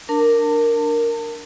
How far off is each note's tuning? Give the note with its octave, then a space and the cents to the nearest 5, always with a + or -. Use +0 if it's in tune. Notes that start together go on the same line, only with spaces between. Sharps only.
D4 +0 A#4 -5 A5 +35